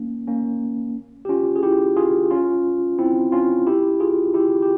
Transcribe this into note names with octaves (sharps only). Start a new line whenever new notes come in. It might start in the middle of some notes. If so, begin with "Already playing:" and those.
Already playing: A#3 C#4
A#3 C#4
G4
C#4 F4
G#4
E4 G4
F4 G#4
C#4 F4
C4 E4
C#4 F4
E4 G4
F4 G#4
E4 G4
G4